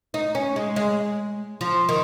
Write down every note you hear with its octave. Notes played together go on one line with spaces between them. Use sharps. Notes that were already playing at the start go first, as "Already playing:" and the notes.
D#4
C#4
G#3
G#3
F3
D#3